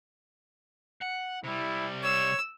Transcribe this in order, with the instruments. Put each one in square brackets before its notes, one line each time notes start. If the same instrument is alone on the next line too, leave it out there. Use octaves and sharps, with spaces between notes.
[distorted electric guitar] F#5
[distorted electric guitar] C3 G3 [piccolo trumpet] E4
[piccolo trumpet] C#5 [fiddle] E6